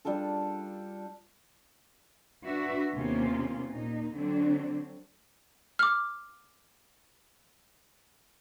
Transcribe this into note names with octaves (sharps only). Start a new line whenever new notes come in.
G3 D4 F4 A4
D4 F#4 B4 E5
D#2 C3 A#3 B3 C#4 F4
A#2 D#4
D3 F#3 C4 D4
D6 F6